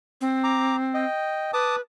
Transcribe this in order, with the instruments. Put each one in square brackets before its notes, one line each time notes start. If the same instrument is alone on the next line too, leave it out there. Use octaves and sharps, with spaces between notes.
[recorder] C4
[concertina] A#5 D6
D#5 G5
[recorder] B4 [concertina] A5 D6 D#6